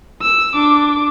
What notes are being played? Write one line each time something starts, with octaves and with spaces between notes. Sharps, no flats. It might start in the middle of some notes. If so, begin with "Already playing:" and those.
E6
D4 D6